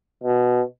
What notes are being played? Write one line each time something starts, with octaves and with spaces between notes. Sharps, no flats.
B2